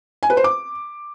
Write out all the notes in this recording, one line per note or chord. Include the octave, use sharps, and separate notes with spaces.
G#5
B4
C5
D6